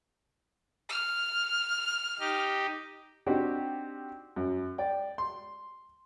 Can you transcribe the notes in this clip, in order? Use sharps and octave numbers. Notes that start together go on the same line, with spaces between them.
F6
D#4 G4
C4 D4 D#4 F#4 G4
F#2
D5 G5
C6